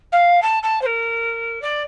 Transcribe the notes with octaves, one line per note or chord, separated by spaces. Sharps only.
F5
A5
A5
C5
A#4
D5